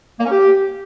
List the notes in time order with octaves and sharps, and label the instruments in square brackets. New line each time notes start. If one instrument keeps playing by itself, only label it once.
[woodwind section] A#3
C#4
G4